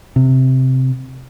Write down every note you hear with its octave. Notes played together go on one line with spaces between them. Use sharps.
C3